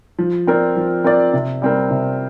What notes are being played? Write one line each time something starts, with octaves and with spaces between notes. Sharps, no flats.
F3
C4 A#4 D5
F3
C4 A#4 D5
C3
G3 C4 A#4
C3